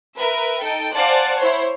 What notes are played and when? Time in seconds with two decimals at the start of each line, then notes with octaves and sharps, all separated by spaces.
0.15 A#4 B4 E5
0.61 D#4 A4 G5
0.95 C5 D5 F5 F#5 G#5 A5
1.38 E4 C5 C#5